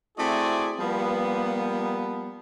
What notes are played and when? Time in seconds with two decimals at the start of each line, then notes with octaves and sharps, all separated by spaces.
0.18 A3 C4 E4 F#4 G#4 D5
0.80 F3 G3 A#3 B3